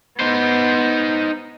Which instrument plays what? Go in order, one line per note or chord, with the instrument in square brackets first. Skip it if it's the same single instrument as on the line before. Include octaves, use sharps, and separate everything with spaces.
[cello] B3 [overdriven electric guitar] D#4 C5